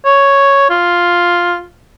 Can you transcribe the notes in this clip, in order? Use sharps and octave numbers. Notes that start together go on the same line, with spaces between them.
C#5
F4